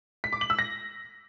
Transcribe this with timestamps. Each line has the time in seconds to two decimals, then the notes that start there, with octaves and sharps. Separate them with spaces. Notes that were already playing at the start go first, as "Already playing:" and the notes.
0.24 B6
0.33 D6
0.41 F#7
0.50 E6
0.59 A#6